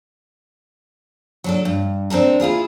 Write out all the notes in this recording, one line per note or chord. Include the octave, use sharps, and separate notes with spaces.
F#3 D4 A4
G2
C4 D4 A4 A#4
E4 F4 G#4 A#4